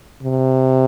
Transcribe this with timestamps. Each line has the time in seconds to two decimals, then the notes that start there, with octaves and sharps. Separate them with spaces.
0.23 C3